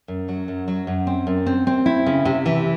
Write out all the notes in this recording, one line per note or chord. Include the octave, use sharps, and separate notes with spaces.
F#2
F#3
F#2
F#3
F#2
C4
F#2
C4
C4
E4
C#3
C3
E3